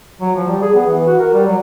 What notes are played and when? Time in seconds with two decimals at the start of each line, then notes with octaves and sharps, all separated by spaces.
0.21 F#3
0.36 F3
0.47 G3
0.62 G#4
0.75 B3
0.86 E3
1.06 F#4
1.19 A#4
1.33 G3
1.47 F#3